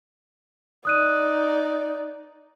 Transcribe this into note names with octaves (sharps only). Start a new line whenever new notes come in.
D#4 D5 D#6 F#6 D#7